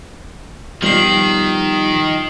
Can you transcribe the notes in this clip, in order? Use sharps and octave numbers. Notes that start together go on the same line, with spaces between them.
B2 D#3 F3 G3 C7 F#7